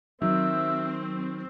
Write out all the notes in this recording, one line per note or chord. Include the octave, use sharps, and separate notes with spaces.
D#3 F#3 C4 E5